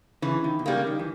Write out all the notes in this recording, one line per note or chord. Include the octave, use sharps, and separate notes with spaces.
C#3 E3
D#3
B2
C#3 G3 A#3
D#3
E3